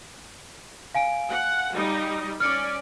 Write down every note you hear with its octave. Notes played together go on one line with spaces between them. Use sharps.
F5 G#5 D7
F#5
G3 D#4
C#4 D5 F6 C#7